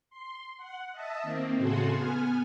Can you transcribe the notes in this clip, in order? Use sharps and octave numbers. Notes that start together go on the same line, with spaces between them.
C6
F#5
D#5 E5 A5
D#3 A#3 C4
A2 C#3 F#4 G#4 A4 C6
B3 G#5 F6